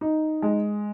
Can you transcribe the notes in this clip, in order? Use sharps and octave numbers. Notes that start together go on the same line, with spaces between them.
D#4
G#3